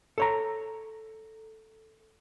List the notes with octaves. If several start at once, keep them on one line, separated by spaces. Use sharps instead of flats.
A4 C#5 A#5